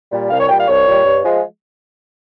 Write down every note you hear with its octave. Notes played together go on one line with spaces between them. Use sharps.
A#2 G3
C2 F5
C#5
A#2 G3 G5
F5
C2 C#5
A#2 G3
G2
F3 G#3